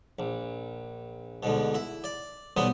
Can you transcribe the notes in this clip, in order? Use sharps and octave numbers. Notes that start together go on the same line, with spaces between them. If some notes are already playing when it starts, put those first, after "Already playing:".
A#1
D2 G#2 B2
E4
D5
B1 B2 G3 B3 C5 D#6